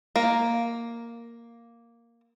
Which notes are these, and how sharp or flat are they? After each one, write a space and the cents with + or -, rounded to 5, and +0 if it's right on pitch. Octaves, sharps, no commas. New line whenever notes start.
A#3 +0